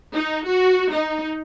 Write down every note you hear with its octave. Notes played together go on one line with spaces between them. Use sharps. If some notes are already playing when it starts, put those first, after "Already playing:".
D#4
F#4
D#4